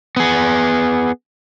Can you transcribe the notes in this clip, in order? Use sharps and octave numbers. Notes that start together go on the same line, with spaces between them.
B3 G#4